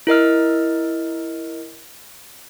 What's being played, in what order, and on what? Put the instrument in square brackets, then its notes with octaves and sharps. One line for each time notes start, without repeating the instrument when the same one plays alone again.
[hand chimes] E4 A#4 D#5 F6